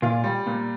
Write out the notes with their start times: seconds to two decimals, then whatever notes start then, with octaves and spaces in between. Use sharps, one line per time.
0.02 A#2 F4
0.24 G3
0.46 A#2